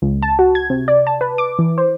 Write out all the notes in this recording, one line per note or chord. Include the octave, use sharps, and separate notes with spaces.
C#2
A5
F#4
G#6
C3
D5
A5
B4
D6
E3
C5